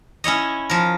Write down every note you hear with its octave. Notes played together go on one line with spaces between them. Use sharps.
C#4 E4 C#5 D#5
F3 A#4